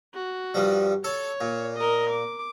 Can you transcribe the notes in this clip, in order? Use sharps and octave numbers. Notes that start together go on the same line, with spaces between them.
F#4
G2 F3 G3
A4 C#5
A#2
A#4 D#5
D6